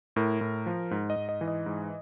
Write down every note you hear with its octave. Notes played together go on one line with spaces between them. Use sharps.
A2 A#4
A2
F3
G#2
D#5
G#2
D#5
E3
D#5
G#2